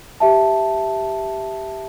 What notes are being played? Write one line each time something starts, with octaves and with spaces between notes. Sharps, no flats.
G4 E5 A5